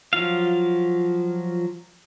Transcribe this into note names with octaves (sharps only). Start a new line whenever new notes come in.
F3 F#3 F4 F5